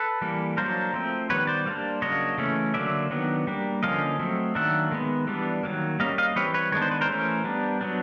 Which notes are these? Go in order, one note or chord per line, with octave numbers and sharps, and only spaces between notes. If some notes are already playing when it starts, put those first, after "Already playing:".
Already playing: A4 B4
E3 G3 A#3
F#3 A#3 D4 A#4 C5
F3 A3 C4
D#3 G3 B3 B4 C#5
C5 D5
G3 A#3 D4
C#3 F#3 A#3 D4 C#5 D#5
C#3 E3 A3 C#4
D3 F#3 A#3 D5 E5
D#3 F#3 B3 D4
G3 A#3 D4
D3 F3 A#3 C#4 D#5 F5
F#3 A3 C4
D#3 F#3 A#3 D4 E5 F#5
D#3 G#3 B3
E3 G3 B3 D4
D#3 F#3 A#3
G3 A#3 C#4 D#5 F5
D#5 F5
E3 G3 C4 B4 C#5
B4 C#5
D#3 G#3 B3 D4 C#5
C5
B4
A#4 C5
E3 A3 C#4
G3 B3 D4
F#3 B3 D4